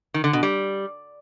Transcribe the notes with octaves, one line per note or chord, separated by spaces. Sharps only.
D#3
D3
B2
G3